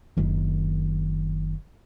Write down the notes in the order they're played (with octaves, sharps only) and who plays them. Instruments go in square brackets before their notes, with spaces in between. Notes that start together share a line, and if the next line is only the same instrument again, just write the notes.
[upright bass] F#1 D#3